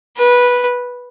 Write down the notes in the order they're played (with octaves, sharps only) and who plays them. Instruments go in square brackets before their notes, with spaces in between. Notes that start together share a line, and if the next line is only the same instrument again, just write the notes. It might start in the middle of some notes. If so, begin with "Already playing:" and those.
[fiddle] B4